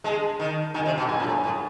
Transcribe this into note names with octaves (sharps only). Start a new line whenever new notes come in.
G#3 A5
D#3
D#3 G#5
C3
B2
A#2 G#5
A#2
A2
A2